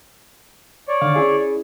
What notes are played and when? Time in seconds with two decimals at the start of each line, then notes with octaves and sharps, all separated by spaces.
0.88 C#5 D5
1.01 D3 D#3 F5
1.16 C#4 E4 G#4